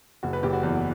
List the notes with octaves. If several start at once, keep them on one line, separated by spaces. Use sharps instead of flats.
F#1 F#4
B4
F#1 G4
F#4
E2